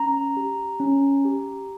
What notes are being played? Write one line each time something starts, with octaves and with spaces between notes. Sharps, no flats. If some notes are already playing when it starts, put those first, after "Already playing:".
Already playing: C#4 A#5
G4
C#4
G4